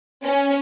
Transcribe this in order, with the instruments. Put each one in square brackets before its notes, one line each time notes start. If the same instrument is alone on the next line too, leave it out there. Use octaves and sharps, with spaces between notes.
[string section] C#4